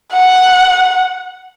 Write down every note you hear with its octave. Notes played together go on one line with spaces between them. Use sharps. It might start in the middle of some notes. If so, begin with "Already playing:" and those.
F#5